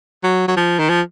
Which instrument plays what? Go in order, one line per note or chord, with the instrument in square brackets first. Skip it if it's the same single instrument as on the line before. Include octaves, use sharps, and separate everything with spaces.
[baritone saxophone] F#3
F#3
F3
D#3
F3